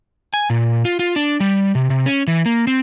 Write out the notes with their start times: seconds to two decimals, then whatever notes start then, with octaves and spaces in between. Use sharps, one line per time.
0.34 G#5
0.50 A#2
0.85 F4
0.99 F4
1.16 D4
1.40 G3
1.75 C3
1.90 C3
2.06 C#4
2.27 E3
2.46 A#3
2.67 C4